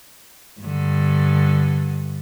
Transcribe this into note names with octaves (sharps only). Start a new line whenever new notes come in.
G2 D3